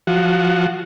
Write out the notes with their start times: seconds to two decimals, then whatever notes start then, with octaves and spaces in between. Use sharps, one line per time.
0.07 F3 F#4